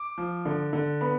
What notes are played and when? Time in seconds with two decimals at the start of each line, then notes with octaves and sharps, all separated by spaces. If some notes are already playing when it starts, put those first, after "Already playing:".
Already playing: D6
0.18 F3
0.45 D3
0.73 D3
1.01 B3 B5